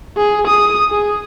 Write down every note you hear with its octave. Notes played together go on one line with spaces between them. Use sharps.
G#4
D#6
G#4